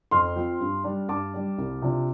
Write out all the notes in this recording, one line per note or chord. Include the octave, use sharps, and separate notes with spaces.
F2 C6 F6
F3 C4
G2
G3 D4
G2 A5 D6
G3 D4
C2
C3 F3 D4